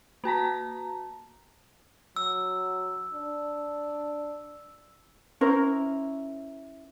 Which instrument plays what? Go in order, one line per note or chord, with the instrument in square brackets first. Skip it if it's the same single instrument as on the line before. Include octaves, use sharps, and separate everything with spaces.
[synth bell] A#3 F#4 A5 A#5
[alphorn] F#3 [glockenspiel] E6
[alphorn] D4
[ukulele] C#4 E4 A#4 C5